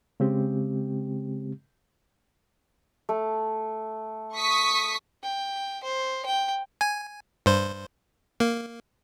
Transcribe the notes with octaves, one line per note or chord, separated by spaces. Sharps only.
C#3 G#3 C4 G4
A3
C#6 D#6 B6
G5
C5
G5
G#5
G2 C5
A#3